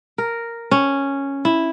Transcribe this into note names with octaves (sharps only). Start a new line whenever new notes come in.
A#4
C#4
E4